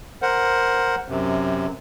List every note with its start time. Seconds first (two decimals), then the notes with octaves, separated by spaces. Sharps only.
0.22 A#4 C5 F#5
1.09 F#2 C3